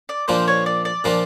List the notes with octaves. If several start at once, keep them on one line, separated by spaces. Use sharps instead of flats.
D5
A#2 F3 A#3 D4 F4 C5
C#5
D5
D5
A#2 F3 A#3 D4 F4